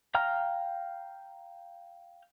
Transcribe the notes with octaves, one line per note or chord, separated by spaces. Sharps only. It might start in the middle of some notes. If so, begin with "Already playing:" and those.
F5 G5 A#5 F6